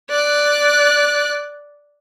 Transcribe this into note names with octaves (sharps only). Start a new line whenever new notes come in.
D5 F#6